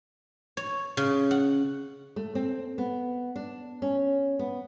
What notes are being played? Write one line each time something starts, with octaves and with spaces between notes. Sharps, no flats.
C#5
C#3
F#5
A3
C4
B3
D4
C#4
B3